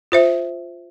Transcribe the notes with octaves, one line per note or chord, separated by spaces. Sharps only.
F4 C5 E5